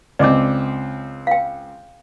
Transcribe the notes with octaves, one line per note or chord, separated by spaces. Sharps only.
C#2 C4 D5 D#5 D6
F5 G5